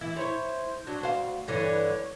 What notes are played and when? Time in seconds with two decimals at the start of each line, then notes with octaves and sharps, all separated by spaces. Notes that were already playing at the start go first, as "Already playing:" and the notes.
0.01 E3 E4
0.16 E4 C5 C#5
0.87 F#3 D4
1.02 D2 F#4 C5 F5
1.48 G2 D3 E3 C#5